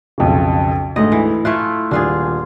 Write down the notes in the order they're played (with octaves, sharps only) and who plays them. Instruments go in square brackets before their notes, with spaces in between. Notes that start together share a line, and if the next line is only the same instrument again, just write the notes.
[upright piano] B1 F2 C#3
[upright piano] D2 G#2 D3 [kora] D#5
[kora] E3
[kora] A3 E4 F4 [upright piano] F#6
[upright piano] D#1 [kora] D4 F4 G#4